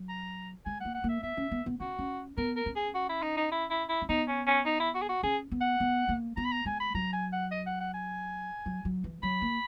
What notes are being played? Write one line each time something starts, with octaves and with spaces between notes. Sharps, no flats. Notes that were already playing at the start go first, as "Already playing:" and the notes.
Already playing: F#3
A#5
G#3 G#5
A#3 F#5
F#5
A#3
E5
B3 E5
C#4
B3
B3
C#4 F#4
C#4
B3 A#4
A#4
C#4
G#4
F#4
E4
D#4
D#4
E4
E4
E4
C#4
B3 D#4
C#4
C#4
D#4
E4
F#4
G#4
F#4
C#4 G#4
B3
F#5
B3
A#3
B3 A#5
B5
A#5
G#3 G#5
B5
F#3 A#5
G#5
F#5
D#5
F#5
F#5
G#5
F#3
F#3
E3
F#3 B5
A#3